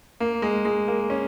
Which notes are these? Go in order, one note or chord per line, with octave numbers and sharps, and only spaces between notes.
A#3
G#3
G#3
A#3
C#4